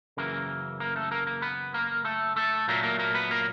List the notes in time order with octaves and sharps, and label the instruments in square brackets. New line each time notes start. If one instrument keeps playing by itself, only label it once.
[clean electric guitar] F#2 C#3 E3 A#3 A#4
A#3 A#4
A3 A4
A#3 A#4
A#3 A#4
B3 B4
A#3 A#4
A3 A4
A3 A4
A#2 F#3 A3 A#3 A#4
A#3 A#4
A#3 A#4
B3 B4
A#3 A#4